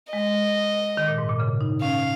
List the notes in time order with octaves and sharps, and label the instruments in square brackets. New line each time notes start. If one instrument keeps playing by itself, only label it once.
[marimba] G#3 [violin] D#5
[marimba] D#3
A#2
G#2
A#2
C#3
D#4
[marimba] C#4 [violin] F5